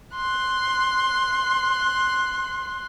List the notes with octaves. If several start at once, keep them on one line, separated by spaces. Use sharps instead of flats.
C6 F#6